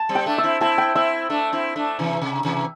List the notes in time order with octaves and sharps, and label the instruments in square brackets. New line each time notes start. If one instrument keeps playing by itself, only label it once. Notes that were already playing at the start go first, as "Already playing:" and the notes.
Already playing: [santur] A5
[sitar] G3 C4
[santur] G5
[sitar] A3 D4
[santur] E5
[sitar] C4 E4
[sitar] C4 E4 [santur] A5
[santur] G5
[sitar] C4 E4 [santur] E5
[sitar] A3 D4
C4 E4
A3 D4
C3 E3
C3
C3 E3